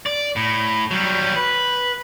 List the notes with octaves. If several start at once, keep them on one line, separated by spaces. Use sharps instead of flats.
D5
A2
F#3 G3
B4